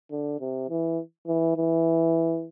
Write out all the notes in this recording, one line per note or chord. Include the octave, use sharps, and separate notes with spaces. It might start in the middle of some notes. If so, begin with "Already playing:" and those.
D3
C3
E3
E3
E3